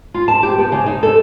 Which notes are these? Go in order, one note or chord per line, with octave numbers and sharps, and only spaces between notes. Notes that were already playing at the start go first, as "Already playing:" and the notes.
F4
A5
G4
B3
C#3
D#4
A4